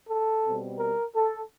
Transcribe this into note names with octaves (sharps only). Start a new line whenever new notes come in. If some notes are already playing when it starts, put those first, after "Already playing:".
A4
B2 G3 C4
A#4
A4